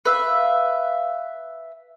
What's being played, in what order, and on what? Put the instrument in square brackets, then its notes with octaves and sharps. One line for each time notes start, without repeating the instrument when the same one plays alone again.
[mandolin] B4 E5 F5